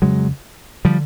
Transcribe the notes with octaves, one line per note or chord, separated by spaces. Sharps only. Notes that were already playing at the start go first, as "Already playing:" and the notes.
F2 C#3 F#3 G#3
D3 F3 G3